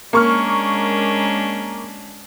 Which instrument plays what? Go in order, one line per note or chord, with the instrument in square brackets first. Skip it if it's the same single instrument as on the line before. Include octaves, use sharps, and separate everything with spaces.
[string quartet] G#3 C#4 D4 [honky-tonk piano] A#3 C#6 F6